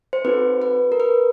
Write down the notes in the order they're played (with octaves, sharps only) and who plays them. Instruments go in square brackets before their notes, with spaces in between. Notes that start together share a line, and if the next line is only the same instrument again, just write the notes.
[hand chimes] C5
C4 D#4 F#4 A4 B4
B4
A#4
B4